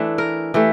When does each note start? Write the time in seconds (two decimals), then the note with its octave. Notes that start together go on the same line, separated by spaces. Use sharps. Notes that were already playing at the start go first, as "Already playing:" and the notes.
Already playing: E3 A3 D4
0.18 A#4
0.54 E3 A3 G4